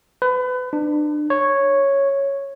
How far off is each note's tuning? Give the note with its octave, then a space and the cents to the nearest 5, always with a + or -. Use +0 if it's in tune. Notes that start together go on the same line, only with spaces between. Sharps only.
B4 +30
D4 +30
C#5 -5